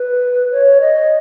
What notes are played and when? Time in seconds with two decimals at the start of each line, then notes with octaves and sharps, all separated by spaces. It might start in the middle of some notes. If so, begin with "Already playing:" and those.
Already playing: B4
0.52 C#5
0.81 D#5